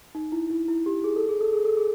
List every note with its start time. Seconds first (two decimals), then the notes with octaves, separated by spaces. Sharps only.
0.15 D#4
0.32 E4
0.50 E4
0.68 E4
0.86 G4
1.04 G#4
1.16 A4
1.29 G#4
1.41 A4
1.53 G#4
1.65 A4
1.77 G#4